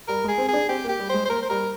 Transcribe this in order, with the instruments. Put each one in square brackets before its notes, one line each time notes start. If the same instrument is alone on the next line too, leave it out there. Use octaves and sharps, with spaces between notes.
[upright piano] G3 [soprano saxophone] A#4
[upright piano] G#3
[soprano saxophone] G#4
[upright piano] C4
[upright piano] D4 [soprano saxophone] G#4
[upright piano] C4 [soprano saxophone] G4
[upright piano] A#3
[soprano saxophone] G4
[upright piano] G3
[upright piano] G#3 [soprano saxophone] C5
[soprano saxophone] C5
[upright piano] A#3 [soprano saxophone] A#4
[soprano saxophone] C5
[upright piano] G3 [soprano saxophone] A#4